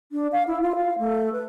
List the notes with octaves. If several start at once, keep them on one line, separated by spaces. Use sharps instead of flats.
D4
F5
E4
F4
F5
A3
B4